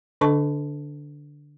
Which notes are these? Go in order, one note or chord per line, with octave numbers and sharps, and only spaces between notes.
D3 D4 A4 D#5 A5 C#6